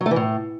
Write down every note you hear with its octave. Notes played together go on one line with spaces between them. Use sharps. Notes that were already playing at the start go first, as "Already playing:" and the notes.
F#3
A3
E3
A2